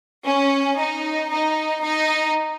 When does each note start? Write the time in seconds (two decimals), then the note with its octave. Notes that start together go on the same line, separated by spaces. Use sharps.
0.26 C#4
0.78 D#4
1.31 D#4
1.83 D#4